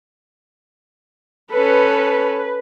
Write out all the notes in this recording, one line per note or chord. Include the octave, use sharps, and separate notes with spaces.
C#4 A4 B4